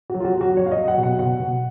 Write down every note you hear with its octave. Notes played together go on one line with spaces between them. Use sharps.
F#3 F#4
F4
F#4
F#3
F#4
F#3 C#5
F5
D#5
F#3
F#5
B2
F#5
B2 F#5
B2